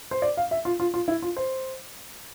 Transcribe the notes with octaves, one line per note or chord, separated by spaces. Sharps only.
C5
D5
F5
E5
F4
F4
F4
E4
F4
C5